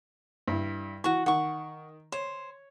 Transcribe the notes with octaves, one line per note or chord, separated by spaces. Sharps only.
G2 E4
E3 F#4 C#6
D#3 F#5 C#6
C5 C#5